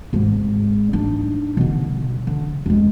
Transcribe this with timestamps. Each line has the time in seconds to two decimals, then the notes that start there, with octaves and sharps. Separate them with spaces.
0.13 G#1 G#2
0.93 D4 D#4
1.57 B2 D3
2.27 D3
2.66 E1 G#3